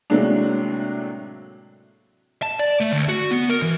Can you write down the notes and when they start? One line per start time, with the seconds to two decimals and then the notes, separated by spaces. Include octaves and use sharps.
0.10 A2 C3 F#3 G#3 A#3 D4
2.42 A5
2.59 D5
2.81 A3
2.92 D2
3.09 F#4
3.31 B3
3.49 A#4
3.62 E3